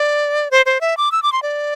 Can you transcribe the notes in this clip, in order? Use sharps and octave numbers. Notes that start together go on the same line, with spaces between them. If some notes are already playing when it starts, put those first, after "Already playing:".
Already playing: D5
C5
C5
E5
D6
E6
D6
C6
D5